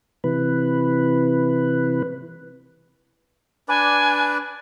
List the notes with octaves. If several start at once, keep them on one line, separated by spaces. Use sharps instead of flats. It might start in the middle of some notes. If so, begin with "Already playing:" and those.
C3 E3 B4
D4 B4 D5 G#5